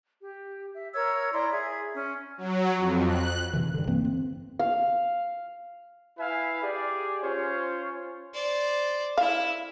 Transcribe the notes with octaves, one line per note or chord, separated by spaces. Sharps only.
G4
E5
A#4 C#5 E6 G#6
E4 D5 A#5 C6
G#4 E5 G#6
C#4
F#3
F2
F#6
C3 D#3 E3
G2 D3
G2 E3 A#3 C4
C4
F5
E4 B4 E5 F5 G#5
G4 G#4 D5
C#4 F4 C5 C#5
C5 D5
E4 E5 F5